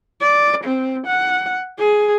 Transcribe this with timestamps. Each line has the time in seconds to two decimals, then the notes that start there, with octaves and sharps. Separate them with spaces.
0.21 D5
0.64 C4
1.06 F#5
1.79 G#4